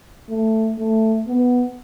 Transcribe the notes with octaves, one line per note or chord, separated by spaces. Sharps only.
A3
A3
B3